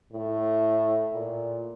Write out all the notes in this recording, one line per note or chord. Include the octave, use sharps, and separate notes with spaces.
A2
A#2